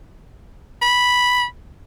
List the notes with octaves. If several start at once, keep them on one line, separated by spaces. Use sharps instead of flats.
B5